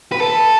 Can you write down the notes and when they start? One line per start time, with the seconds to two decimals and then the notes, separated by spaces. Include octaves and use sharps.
0.12 B4
0.20 A4